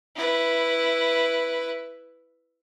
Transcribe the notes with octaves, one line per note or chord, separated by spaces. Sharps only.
E4 B4